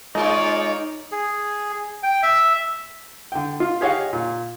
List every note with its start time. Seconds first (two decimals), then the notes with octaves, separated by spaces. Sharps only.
0.15 G#3 A#3 D#4 F4 C#5 D5
1.12 G#4
2.03 G5
2.23 E5
3.32 D3 G5
3.60 F4
3.81 G4 G#4 C#5 D#5 F5 F#5
4.13 A#2